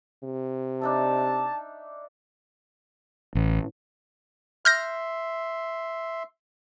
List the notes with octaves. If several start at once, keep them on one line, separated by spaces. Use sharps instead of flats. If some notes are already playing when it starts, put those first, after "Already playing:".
C3
D4 D#4 E5 A5
A1
E5 C6 F6 G6 A#6